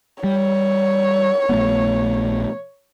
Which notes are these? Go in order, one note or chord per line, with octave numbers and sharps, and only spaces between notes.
G3 C#5
A#1 A3 B3